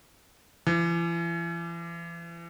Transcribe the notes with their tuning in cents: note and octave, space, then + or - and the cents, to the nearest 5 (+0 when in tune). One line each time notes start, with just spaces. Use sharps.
E3 +40